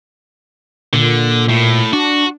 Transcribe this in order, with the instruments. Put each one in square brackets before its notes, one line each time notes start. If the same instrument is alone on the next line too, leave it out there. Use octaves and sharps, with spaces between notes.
[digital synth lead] A#2 [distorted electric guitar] D3
[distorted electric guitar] A2
[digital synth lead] D4 [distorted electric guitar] F#4